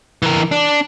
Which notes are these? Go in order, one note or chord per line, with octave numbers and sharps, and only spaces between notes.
E3 A#4
D4